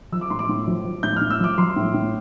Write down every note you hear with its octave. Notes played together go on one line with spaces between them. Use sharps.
F3 E6
D6
A2 C6
D6
A2
F3
F3
A2 G6
A2 F6
E6
F3 D6
F3 C6
A2
A2